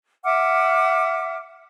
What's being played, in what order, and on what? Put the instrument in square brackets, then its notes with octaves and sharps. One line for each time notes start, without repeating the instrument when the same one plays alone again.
[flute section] E5 F#5 D6 F6